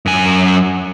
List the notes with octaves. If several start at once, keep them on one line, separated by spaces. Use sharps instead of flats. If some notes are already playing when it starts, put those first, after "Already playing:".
F#2 G#5